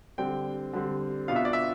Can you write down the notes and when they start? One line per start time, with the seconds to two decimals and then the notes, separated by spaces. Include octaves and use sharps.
0.18 D3 G3 C4 G5
0.73 D3 G3 C4
1.28 B2 B3 D4 F4 F5
1.36 E5
1.45 D5
1.53 E5